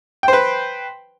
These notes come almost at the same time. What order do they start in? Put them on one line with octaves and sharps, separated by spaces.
G5 C5 B4